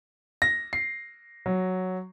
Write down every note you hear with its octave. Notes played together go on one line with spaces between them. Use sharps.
A#6
C7
F#3